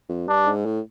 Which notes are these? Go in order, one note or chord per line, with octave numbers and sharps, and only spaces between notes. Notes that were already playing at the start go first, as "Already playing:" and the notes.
F2
G2 D4
G#2
A2